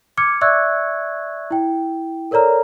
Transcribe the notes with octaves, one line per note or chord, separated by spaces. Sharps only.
D6 F6 G#6 C#7
D5 E5 C#6 E6 F#6 G#6
E4 G5
A4 A#4 C#5 D5 A#5 F6